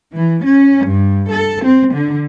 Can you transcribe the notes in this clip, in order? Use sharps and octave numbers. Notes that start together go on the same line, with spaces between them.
E3
C#4
G2
A4
C4
D3